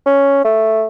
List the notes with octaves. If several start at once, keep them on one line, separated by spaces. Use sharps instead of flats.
C#4
A3